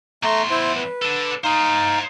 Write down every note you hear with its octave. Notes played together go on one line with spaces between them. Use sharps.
E2 A3 A#5 C6 C#6
E4 C5
B4
D4 A4
D#4 C5 D#5 F5